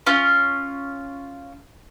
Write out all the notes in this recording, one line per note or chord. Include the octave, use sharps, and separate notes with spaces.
C#4 F4